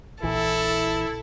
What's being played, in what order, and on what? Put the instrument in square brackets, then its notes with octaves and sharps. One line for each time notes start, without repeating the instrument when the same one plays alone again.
[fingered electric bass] A#1 E3 [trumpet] E4 [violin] A4